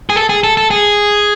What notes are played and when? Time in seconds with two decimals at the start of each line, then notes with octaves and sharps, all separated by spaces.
0.10 G#4
0.16 A4
0.29 G#4
0.44 A4
0.57 A4
0.71 G#4